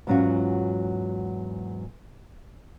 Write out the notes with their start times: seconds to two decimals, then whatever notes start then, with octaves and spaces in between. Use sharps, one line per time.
0.07 E2 G#2 F#3 C#4 F4 F#4